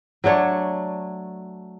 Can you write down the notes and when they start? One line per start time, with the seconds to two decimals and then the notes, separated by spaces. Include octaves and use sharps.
0.24 F#3 A3 D4 C#5